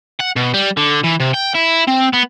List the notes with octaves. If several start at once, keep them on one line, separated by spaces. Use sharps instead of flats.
F#5
B2
G3
D3
E3
C3
G5
E4
C4
B3